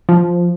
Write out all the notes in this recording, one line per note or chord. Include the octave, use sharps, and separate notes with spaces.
F3